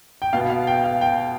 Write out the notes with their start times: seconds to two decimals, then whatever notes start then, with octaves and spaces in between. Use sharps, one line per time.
0.22 G5
0.33 B2 B3 F5
0.50 F5
0.67 G5
0.84 F5
1.01 G5